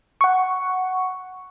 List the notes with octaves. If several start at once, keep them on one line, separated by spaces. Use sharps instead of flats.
F#5 C#6